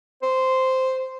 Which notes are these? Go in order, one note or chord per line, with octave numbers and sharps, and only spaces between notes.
C5